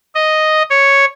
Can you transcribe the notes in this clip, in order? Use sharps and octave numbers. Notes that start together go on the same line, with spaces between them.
D#5
C#5